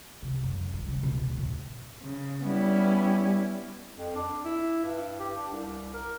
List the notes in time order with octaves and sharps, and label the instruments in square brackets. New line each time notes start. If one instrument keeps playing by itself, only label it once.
[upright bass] C3
F#2
D3
G3
C#3
B2
D#2
A2
[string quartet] C#3
[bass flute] G3 [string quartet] B3 C#4 E4
[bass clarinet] F2
D4
E4
G2
G4
D4
C2
A#4